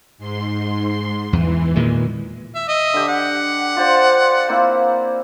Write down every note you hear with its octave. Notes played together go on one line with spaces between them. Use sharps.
G#2 C6
E2 E3
A#2 D#3 G#3
E5
D#5 E5
D3 G4
F#5
F4 C5 D5
A#3 C4 E4